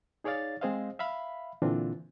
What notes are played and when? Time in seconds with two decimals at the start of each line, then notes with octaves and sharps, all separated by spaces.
0.24 D#4 G#4 C#5 D5 F5 A6
0.61 G#3 C4 G#4 C5 D#5 F5
0.99 E5 F5 B5
1.62 A#2 D3 E3 C4 D4 F4